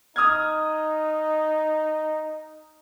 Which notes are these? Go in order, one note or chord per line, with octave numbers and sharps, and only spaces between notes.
D#4 D#6 F6 G#6